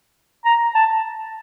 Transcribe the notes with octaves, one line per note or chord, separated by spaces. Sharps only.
A#5
A5